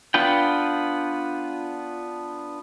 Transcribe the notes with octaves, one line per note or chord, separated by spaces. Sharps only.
B3 D4 F4 B4 G5